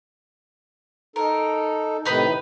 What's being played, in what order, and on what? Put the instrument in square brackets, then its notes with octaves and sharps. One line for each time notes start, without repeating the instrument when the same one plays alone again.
[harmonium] D#4 A4 [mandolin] A#4
[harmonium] A2 C3 D#3 [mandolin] D#4 B4